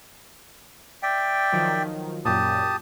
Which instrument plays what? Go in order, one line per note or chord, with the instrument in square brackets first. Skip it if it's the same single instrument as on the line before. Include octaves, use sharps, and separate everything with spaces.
[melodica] D5 E5 G5
[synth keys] D#3 F3 F#3
[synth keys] F#2 A#2 [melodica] G4 A5 D#6